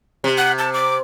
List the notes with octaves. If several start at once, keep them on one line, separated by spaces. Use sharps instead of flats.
C3
F#5
A5
D6